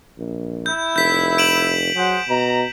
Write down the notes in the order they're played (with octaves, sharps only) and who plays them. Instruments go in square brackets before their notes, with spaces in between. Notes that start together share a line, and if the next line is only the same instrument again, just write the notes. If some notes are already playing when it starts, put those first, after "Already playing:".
[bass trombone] A#1
[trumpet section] E4 [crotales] G6
[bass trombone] F1 [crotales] G6 B6
[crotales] D7 E7 F#7
[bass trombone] F#3 [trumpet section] G#4 C5 F#5
[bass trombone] B2 [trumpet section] A#5